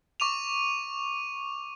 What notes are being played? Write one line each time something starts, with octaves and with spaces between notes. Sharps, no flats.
C#6 D6 D#7 F7